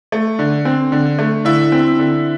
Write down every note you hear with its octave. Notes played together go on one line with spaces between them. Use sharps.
A3
D3
C4
D3
A3
D3 E4 E5
C4
D3